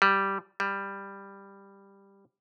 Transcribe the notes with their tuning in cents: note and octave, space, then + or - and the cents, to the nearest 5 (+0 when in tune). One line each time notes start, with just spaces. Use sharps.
G3 -5
G3 +10